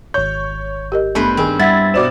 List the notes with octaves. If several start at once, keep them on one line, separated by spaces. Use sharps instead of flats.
G#1 C#5 G6
G4 A#4 D#5
G2 A3 B3 B4 C5
D#3 C4 G#4
G3 E4 E5 F#5 G#6 A6 B6
B2 C5 D5 D6 E7